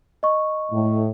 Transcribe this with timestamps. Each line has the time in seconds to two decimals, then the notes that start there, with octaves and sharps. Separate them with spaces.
0.23 D#5 C#6
0.72 A2